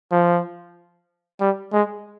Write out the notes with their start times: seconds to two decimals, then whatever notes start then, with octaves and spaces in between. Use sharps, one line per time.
0.12 F3
1.41 G3
1.73 G#3